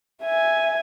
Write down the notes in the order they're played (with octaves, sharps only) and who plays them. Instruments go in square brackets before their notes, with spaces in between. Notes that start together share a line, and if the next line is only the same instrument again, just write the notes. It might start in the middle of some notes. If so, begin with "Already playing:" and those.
[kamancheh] E5 G#5